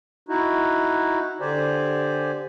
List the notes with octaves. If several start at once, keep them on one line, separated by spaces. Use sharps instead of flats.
D#4 E4 F#4
D3 G4 C5 D5 G#5